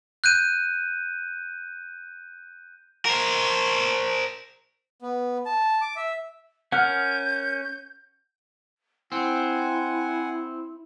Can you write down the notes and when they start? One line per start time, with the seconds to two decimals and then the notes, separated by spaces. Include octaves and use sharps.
0.24 F#6 G6 D#7
3.05 A#4 C5
5.02 B3
5.46 A5
5.81 D6
5.96 E5
6.72 C#4 A#4 F#5 F6 G6
9.12 C4 E4 F#5 G#5